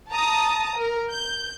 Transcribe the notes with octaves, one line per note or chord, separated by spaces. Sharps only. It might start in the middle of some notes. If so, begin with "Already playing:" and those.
A5 A#5 D#6
A#4
G6